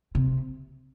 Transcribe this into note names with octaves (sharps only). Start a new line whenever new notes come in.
C3